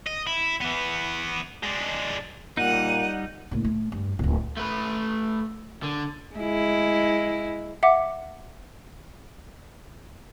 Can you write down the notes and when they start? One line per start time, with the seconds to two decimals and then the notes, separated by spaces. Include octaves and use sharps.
0.07 D#5
0.27 E4
0.61 E3 B3
1.63 G#3 D4
2.57 A#2 G3 D#4 F#5 D#7
3.51 A#1 A2
3.65 A3
3.92 G2
4.19 D1 B1
4.57 A3 B4
5.83 D3
6.37 G#3 E4
7.83 E5 F#5 D6